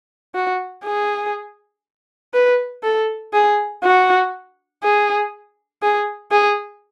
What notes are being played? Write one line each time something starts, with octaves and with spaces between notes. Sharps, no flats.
F#4
G#4
B4
A4
G#4
F#4
G#4
G#4
G#4